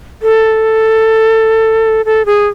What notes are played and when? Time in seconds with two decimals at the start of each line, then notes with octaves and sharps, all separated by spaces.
0.22 A4
2.05 A4
2.26 G#4